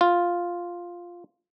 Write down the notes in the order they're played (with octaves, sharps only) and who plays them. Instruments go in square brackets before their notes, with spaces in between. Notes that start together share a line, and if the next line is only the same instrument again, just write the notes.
[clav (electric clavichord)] F4